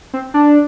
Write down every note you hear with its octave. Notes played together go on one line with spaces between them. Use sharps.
C4
D4